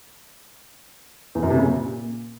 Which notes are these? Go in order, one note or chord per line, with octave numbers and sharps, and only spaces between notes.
E2
F#2
C3
C#3
A#2